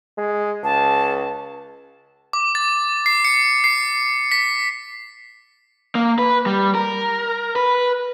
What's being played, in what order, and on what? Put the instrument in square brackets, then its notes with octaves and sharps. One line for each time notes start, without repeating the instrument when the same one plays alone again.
[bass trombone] G#3
[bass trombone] C#2 [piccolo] A5
[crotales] D6
A6
C7
C#7
C7
B6
[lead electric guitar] A#3
B4
G3
A#4
B4